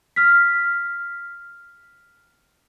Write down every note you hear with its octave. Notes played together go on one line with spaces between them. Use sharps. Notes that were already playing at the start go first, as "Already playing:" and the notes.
F6 B6